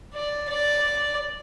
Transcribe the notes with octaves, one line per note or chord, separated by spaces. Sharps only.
D5
D5